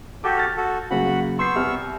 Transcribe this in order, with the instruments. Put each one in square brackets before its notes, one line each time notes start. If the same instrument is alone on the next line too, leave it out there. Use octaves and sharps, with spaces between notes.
[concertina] F#4 G4 A4 [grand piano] D6 G6
[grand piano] F6 A6
[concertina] F#4 A4
[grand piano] C#3 F#3 A#3 [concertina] F#4 F#5 B5
[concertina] B3 C#6 E6 [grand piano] C6 G6 C7
[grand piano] C2 G3 F6